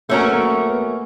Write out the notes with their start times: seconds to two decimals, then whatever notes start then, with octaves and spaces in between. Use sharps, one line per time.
0.09 A3 A#3 C#4 F#4 A#4
0.22 B3
0.34 A#3
0.69 B3